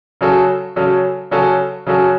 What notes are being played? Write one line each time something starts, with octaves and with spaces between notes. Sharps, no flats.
C#3 F#3 C#4 F#4 A4
C#3 F#3 C#4 F#4 A4
C#3 F#3 C#4 F#4 A4
C#3 F#3 C#4 F#4 A4